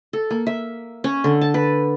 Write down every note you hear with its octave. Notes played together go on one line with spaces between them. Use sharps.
A4
A#3
E5
C#4
D3
A5
B4